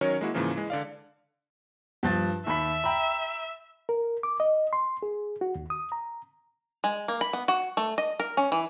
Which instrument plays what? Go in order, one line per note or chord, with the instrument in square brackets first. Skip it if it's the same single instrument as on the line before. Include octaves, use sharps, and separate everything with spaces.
[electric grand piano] D#3 F#3 C#4 A#4 C#5
G#3 A#3 E4 F#4
G#2 C#3 E3 F3 A#3 C#4
E3 G#3
D3 D5 F5
[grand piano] G2 F3 A6
[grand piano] D#2 B5 B6 [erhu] E5
[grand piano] G5 A#5 B5
[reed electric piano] A#4
D6
D#5
C6
G#4
F#4
D#2
D#6
A#5
[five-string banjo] G#3
A#3
B5
B3
F#4
A3
D#5
A#4
C#4
E3